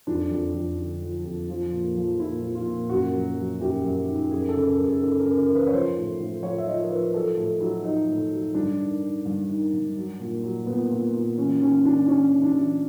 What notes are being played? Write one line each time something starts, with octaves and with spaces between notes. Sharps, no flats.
F2 D4
F2
F2
D3
F3
F2
F3
A#2
F3
A#2 E4
F3
F4
A#2
F#2 F#4
F#3
F#3
F#2 G4
F#2
D#3
F#2 G#4
A4
C#3
A#4
F#2
G#4
C#3 A4
A#4
C#3
A#4
E3
B4
C#5
F3 C5
A2
A2
F3 C#5
E5
F3 D#5
A#4
F3 B4
F#3 A4
A2 A4
F#3 E4
F#3 D#4
A2
F#3
G2 D4
D#3
D#3
G2
D#3
G2
F#3
A#2
F#3
A#2 B3
A#2
A#2
E3 C#4
E3 C#4
E3 D4
E3 C#4
E3
D4
E3